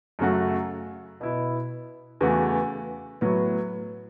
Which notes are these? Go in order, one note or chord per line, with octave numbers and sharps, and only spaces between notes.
F#2 C#3 F#3 A3 F#4
B2 B3 E4
E2 C#3 E3 A3 F#4
A2 F#3 B3